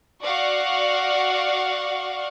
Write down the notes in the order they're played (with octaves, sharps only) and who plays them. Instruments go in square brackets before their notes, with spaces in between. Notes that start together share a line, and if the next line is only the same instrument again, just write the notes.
[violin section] F#4 D5 F5 F#5 C#6